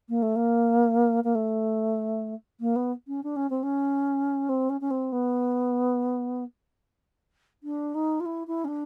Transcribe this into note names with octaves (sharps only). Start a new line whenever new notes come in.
A#3
A3
A#3
A#3
A3
A#3
B3
C#4
D4
C#4
C4
C#4
C4
C#4
C#4
C4
B3
D4
D#4
F4
E4
E4
C#4
D4